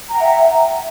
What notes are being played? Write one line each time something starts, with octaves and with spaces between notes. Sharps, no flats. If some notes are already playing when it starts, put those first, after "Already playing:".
E5 F#5 G5 A#5